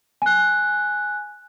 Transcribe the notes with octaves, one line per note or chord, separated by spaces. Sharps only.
G#5 F#6